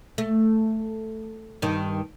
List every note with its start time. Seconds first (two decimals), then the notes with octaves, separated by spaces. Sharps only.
0.18 A3
1.62 G2 D#3